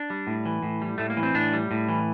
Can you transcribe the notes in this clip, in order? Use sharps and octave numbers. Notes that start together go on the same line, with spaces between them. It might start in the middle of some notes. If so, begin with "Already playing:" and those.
Already playing: D4
G3
A2
E3
A2
G3
A2 A3
A#3
E3
C4
A2 D4
G3
A2
E3